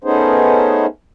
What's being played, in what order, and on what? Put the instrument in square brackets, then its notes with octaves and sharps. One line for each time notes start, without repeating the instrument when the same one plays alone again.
[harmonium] A3 B3 C#4 D#4 G#4 C5